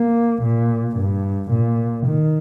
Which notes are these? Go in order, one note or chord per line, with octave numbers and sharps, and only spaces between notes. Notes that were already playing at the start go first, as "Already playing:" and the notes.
Already playing: A#3
A#2
G2
A#2
D#3